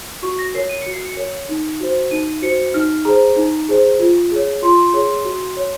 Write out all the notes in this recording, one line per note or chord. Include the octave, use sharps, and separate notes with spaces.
F#4 C#6
A#6
A#4 C#5 C7
D#7
F#4 C#7
C7
C#7
A#4 C#5
D#4
F#4 C5
D#4 D#7
F#4 C5 C#7
D#4 F6
G#4 C5 A#5
D#4
G#4 C5
F4
G#4 C#5
F4 C6
G#4 C#5
F#4
C#5